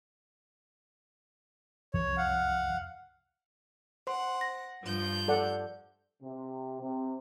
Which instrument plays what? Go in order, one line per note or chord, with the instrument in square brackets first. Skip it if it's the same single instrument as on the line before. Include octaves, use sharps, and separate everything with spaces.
[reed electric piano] C2 F2 [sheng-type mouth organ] C#5
[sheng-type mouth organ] F5 F#5
[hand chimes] C5 C6 [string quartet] F#5
[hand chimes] A#6
[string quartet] G2 F3 G6
[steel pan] A4 D5 F#5
[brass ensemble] C3
C3